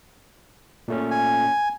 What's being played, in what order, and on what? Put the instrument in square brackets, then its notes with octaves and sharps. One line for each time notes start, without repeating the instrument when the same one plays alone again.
[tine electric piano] A#2 A3 C#4
[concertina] G#5